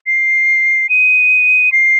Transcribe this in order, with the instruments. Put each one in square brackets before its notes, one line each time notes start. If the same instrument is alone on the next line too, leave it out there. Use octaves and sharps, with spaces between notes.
[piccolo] C7
D#7
C7